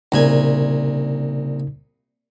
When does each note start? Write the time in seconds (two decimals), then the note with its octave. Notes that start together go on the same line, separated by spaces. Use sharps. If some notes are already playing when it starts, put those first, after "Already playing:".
0.12 C2 A#2 C#3 D#4 G#5